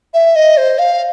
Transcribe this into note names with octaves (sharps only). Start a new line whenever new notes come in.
E5
D#5
C5
F5